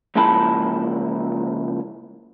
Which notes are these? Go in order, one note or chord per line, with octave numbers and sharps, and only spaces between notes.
C#2 F3 A#3 E4 A5 B5